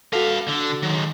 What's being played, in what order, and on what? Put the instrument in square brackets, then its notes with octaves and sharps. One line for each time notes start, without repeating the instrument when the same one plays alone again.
[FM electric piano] F#4 A4 [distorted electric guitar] B4 F5
[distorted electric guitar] D3
[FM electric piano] D#3 [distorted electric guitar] F#3 G#3